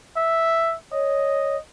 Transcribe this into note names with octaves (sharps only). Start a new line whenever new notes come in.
E5
C#5 D#5